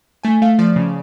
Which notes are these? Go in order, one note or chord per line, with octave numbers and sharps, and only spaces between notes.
A3 G#5
A3 F5
F3 D5
C#3